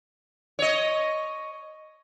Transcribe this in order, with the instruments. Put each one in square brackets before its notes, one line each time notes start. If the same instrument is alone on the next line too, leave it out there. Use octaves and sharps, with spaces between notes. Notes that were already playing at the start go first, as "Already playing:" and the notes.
[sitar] C#5 D#5